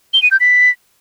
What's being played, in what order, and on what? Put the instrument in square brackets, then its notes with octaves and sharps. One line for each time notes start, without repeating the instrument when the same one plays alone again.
[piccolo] G7
D#7
G6
B6